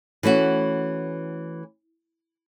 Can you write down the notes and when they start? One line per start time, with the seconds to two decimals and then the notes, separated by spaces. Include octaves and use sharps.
0.23 E3 A3 C#4 F#4